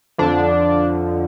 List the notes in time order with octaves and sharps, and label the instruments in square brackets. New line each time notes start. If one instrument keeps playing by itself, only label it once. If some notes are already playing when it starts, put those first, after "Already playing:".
[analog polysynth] F2 D3 F3 D4